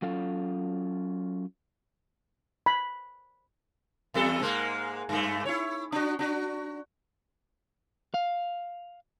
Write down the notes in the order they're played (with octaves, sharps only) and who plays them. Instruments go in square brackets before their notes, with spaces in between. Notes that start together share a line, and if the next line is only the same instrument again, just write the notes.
[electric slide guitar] F#3 C#4 F4 A4 F5
[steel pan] B5
[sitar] E2 G3 A4
G#2 G#3 A#3
G2 A3
E4 C#5
D4 F#4
D4 F#4
[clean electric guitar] F5